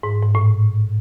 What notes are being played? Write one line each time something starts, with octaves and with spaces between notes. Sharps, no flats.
G#2
G#2
A2